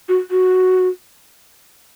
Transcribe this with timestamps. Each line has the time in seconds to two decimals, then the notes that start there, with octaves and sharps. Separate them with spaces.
0.09 F#4
0.31 F#4